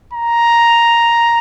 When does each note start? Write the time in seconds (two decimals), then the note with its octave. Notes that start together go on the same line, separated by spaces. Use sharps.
0.13 A#5